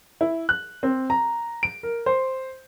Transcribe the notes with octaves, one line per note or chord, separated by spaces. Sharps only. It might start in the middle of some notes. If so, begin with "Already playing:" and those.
E4
F#6
C4
A#5
D7
A#4
C5